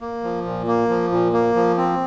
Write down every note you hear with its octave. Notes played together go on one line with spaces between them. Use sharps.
A#3
F3
A#2
A#3
F3
A#2
A#3
F3
C4